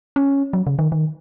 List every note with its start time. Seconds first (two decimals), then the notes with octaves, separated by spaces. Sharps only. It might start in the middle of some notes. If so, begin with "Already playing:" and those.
0.16 C#4
0.53 F#3
0.67 C#3
0.79 D#3
0.92 D#3